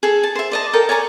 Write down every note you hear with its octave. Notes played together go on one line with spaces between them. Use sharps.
G#4 A4
A5
C5 E5
D5 D#5 A5
A4 A#4 G5 D#6
C#5 D5 G#5 A#5